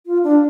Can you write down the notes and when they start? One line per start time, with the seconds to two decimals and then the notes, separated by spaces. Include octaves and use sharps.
0.06 F4
0.24 D4